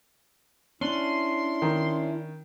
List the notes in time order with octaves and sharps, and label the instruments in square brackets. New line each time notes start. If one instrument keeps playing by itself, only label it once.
[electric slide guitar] C#4 D4 [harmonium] E4 [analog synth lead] C6
[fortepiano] D#3